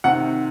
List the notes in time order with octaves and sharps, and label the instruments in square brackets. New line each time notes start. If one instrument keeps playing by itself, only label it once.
[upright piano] C3 D#3 F#5